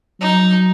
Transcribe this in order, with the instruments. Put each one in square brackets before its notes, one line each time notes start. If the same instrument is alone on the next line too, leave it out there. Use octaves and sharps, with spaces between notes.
[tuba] F#3 [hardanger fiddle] D#4